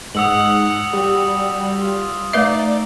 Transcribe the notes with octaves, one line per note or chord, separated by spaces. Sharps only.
G#2 F#5 D#6 E6 F#7
G3 F#4
F4
A3 D#4 B4 D5 E5